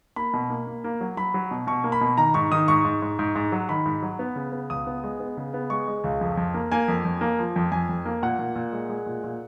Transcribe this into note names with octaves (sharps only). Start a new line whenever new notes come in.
A#3 B5
B2
A#3
A#3
A#3
F#3
F#3 B5
F#3
B2
B2 C#6
A#3
B5
B2
D#3 A#5
G#2 C#6
D#3 D#6
G#2 C#6
G#2
G#2
G#2
G#2
F#3
D#3 B5
G#2
F#3
B3
C#3
B3
C#2 D#6
B3
G#3
B3
C#3
B3
G#3 C#6
G#3
C#2
F2
F2
A#3
A#3 G#5
F2
F2
A#3
F3
F2
F2 G#5
F2
A#3
A#2 F#5
A#2
A#2
G#3
G#3
A#2
A#2